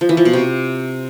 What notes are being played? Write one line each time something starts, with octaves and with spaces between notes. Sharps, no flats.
F3
E3
F3
B2
C3